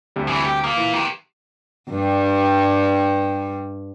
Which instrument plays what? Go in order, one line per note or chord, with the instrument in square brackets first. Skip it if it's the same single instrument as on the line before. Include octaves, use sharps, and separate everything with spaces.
[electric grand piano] D2 C3 G3
[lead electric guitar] A2 E3
G4
[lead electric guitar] A#3 F4 [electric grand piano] D#6
[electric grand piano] E3
[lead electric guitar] G4 A#4
[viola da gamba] G2 G3